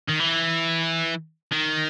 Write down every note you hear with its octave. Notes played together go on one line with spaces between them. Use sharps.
D#3
E3
D#3